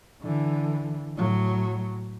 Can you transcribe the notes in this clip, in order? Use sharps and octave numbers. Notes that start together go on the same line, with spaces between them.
D3 E3
A2 F#3